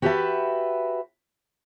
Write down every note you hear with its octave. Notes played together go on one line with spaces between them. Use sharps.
F#4 G4 B4 D5 E5 A5